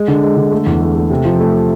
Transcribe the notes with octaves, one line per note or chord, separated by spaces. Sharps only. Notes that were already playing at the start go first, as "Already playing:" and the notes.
Already playing: G#3
D3
G#3
D3
A3
E2
A3
A3
C3
F3
A3